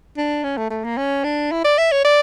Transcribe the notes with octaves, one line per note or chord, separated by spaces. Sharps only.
D4
C#4
A3
A3
A#3
C#4
D4
E4
D5
E5
C#5
D5